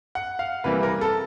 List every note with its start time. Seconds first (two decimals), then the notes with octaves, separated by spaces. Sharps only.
0.15 F#5
0.39 F5
0.64 C3 E3 G3 A#3 B4
0.83 A#4
1.01 A4